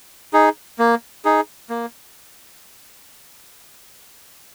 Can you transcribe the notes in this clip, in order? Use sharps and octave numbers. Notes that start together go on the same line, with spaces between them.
D#4 G#4
A#3
D#4 G#4
A#3